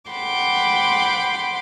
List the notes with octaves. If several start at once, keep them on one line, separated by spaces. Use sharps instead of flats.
F#5 G5 B5 C6 D6